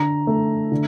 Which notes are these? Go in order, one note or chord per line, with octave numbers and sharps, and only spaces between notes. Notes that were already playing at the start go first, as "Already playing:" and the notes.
Already playing: D3 A#5
A3
D3